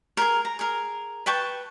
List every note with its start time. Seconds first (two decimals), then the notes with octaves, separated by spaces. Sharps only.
0.17 G#4 A#4
0.45 A#5
0.59 G#4 A#4
1.26 B4 G5 A5 C#6